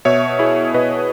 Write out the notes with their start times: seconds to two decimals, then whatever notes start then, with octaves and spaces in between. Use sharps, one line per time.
0.05 B2 C#5 E5
0.39 E4 G#4
0.74 B2 B4 D#5